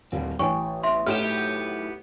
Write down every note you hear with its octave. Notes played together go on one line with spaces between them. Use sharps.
D#1 A2 G3 C4
A1 G5 G#5 C#6
C#3 E3 B3 E5 C6
A2 B3 C#4 D#4 G4 F6 E7
D#3 F#3 E4